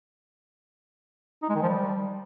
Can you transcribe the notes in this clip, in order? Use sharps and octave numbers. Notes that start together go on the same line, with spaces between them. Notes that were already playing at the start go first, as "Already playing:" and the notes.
D#4
G#3
D#3
F3
G3